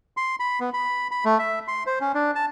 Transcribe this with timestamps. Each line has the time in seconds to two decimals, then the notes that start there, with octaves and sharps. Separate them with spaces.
0.17 C6
0.40 B5
0.60 B3
0.74 B5
1.11 B5
1.25 A3
1.39 E5
1.68 C6
1.86 C5
2.01 C#4
2.15 D4
2.35 A5